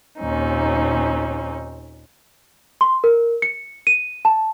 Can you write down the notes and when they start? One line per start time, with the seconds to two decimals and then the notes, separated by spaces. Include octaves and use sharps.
0.21 D#2 A#2 C4 C#4 D#4
2.81 C6
3.04 A#4
3.42 C#7
3.87 D#7
4.25 A5